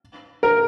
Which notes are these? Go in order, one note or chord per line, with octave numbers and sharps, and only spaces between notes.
A#4